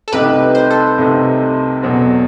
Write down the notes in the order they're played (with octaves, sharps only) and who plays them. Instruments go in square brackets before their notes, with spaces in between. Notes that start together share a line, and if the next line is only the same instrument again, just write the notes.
[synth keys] A4
[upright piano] C2 C3 D#3 A3 D#4 [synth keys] G4 B4
[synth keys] C5
A4 C5
[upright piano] C2 C3 D#3 A3 D#4
E2 B2 F#3 C4